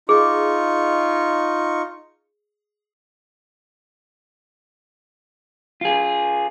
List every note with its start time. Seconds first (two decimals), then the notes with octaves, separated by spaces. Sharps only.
0.09 D#4 F4 G#4 C#6
5.81 F4 G#4